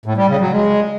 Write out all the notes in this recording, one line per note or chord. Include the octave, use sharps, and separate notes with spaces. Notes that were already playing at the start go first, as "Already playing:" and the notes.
A2
G3
C#3
F#3
G#3